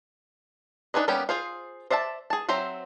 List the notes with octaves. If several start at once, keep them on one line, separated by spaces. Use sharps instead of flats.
D4 D#4 G#4 B4 D#5
G3 A#3 B3 C#4 G4
F4 G#4 C5 F5
C5 D5 E5 F#5 A5
G#4 A5
F#3 C4 C5 E5 A#5